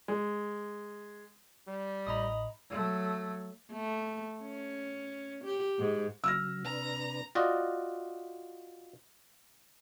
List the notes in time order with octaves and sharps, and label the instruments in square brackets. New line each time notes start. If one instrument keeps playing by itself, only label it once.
[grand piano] G#3
[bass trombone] G3
[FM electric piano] A1 A2 [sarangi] D#5 [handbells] A#5 B5 D#6
[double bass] F#3 A3
[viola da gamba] A3
C#4
G4
G#2
[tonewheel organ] C#3 F#3 [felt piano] E6 F6 A#6
[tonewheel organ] C3 D4 B4 [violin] A#5
[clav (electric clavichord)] F4 F#4 D5 D#5